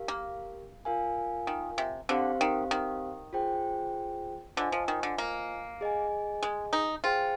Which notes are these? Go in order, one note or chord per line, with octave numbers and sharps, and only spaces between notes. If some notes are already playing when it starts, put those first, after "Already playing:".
Already playing: G4 A#4 F5
A#3
F4 A#4 F5 G#5
D#3
C3
D3 C4 G4 C5 F5
D#3
D#3
F4 G#4 C5 G5
D3 F4 C5 D#5 G#5
F3
D#3
D3
A#3
G#4 D#5 G#5
G#3
D#4
F4 G#4 C5 G5